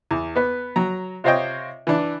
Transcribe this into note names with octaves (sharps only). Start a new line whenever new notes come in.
E2
B3 B4
F#3 A#5
C3 F4 C5 C#5 D#5 G5
E3 D4